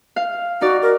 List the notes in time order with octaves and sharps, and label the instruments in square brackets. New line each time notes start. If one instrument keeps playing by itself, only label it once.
[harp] F5
[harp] D#4 D5 [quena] F#4
[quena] A#4